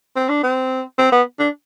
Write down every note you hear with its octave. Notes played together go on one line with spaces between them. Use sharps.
C4
D4
C4
C4
B3
D4